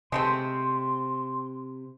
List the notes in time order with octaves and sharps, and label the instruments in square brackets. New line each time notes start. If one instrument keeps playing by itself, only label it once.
[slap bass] C3 [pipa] G#3 A3 C4 [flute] C6